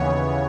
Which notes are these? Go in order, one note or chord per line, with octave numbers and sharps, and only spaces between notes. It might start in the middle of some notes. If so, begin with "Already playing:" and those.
Already playing: D#2 C#3 E3 B3 C#5